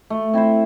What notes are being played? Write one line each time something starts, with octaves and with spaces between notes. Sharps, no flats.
A3
C4 E4 C5